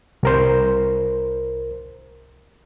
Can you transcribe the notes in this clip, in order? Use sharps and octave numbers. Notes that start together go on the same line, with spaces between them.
C2 A#4 C5